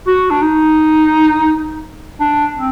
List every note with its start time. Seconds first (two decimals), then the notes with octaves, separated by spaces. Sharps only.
0.07 F#4
0.31 D4
0.42 D#4
2.21 D4
2.56 C4